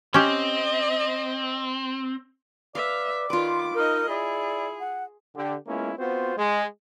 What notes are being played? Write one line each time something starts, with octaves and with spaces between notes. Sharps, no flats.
C4 C#4 G4 D#5
B4 D5 E5 F5
D#3 F4 B4 C6 D6
D#4 A#4 D#5
E4 G#4 D5
F#5
D3 G4
G#3 A#3 B3 C#4 E4 F4
B3 C4 F4 F#4 C5
G#3